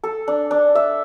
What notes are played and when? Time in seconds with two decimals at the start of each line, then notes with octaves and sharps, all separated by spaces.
0.04 A4
0.28 D4
0.51 D4
0.75 E5